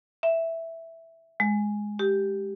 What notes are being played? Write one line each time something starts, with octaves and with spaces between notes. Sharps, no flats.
E5
G#3
G4